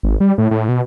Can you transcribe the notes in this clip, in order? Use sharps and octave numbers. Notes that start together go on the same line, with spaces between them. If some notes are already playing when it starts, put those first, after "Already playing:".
G#1
G3
A2
A2
B2